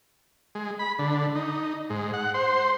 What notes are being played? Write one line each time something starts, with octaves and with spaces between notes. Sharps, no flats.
G#3
B5
D3
D#4
G#2
F#5
C5